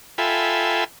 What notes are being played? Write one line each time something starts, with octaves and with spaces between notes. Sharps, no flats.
F4 A4 E5 G5 G#5 B5